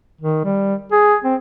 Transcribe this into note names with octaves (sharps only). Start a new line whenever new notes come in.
D#3
G3
G#4
C4